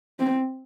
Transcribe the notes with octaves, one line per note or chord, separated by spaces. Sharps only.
C4